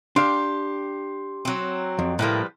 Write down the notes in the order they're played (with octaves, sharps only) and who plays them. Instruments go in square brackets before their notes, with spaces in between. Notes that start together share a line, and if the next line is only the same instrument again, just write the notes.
[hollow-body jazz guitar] D4 F5 [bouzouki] G4 [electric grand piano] C6
[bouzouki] F#3 C4
[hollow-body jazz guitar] F2
[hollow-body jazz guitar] A2 A#3 [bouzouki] F3 G3 B4